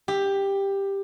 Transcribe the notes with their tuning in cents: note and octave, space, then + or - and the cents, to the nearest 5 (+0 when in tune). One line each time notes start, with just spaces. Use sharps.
G4 +10